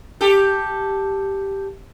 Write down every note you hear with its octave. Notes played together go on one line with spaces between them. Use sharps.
G4 A4